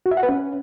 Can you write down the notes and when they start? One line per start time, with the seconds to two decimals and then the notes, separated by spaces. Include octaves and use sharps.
0.06 F#4
0.11 E5
0.17 F#5
0.23 B4
0.29 C#4